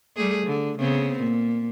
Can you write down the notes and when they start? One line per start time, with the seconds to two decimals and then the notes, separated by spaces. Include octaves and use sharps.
0.17 G3 A3 G#4
0.46 D3
0.78 C#3 B3 C4
1.19 A#2